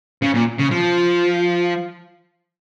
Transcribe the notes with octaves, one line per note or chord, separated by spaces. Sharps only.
C#3
A#2
C#3
F3